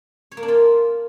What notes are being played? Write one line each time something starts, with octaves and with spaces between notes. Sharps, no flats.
C#5
A#3
D4
F4